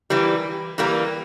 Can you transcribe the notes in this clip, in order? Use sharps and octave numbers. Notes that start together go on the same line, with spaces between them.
E3 G3 A#3
E3 G3 A#3